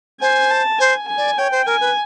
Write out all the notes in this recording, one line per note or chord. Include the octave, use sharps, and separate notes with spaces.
C5 G#5
A5
C5 G#5
G#5
D5
C#5 G5
C5
A#4 G#5
B4